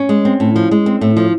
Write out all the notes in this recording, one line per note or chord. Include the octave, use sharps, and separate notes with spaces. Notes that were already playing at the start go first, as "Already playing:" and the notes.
Already playing: C#4
G#3
C4
A2
F3
G#3
C4
A2
F3